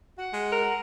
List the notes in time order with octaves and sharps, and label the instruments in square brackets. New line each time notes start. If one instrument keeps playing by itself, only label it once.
[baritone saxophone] F#4 [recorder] F#5
[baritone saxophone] G#3
[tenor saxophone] A#4